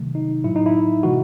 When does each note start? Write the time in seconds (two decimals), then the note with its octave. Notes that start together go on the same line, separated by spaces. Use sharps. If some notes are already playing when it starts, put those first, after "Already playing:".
Already playing: C3 D#3 F#3 A3
0.15 D#4
0.44 A2 F#3 A3 E4
0.56 D#4
0.66 E4
1.03 C3 E3 G#3 F#4